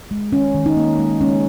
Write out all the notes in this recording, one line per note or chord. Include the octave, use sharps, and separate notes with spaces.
G#3
D#3 C#4
D#3
D#4
A#3
G#3
G#3 C#4